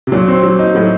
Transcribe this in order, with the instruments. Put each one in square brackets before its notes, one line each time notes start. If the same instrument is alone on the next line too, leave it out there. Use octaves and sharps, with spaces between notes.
[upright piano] C3
[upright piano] A#2 [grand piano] F#3
[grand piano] C4
F#3
D#4
[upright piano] A2 [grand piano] F#3